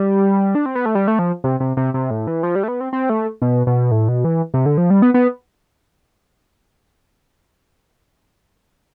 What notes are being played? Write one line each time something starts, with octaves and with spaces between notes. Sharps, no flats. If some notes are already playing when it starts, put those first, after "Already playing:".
Already playing: G3
D4
C4
B3
A3
G3
A3
F3
C3
C3
C3
C3
A2
E3
F3
G3
A3
B3
C4
C4
A3
B2
B2
A2
B2
E3
C3
D3
F3
G3
B3
B3